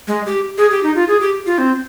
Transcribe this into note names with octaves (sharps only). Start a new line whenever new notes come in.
G#3
G4
G#4
G4
D#4
F4
G#4
G4
F4
C4